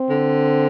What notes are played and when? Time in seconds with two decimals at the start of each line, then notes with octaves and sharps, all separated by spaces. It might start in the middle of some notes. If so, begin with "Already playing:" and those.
Already playing: C4
0.10 D3